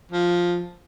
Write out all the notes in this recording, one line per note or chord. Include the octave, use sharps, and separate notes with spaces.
F3